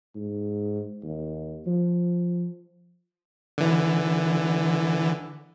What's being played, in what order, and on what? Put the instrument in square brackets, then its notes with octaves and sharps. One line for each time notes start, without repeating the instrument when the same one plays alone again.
[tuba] G#2
D#2
F3
[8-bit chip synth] D3 E3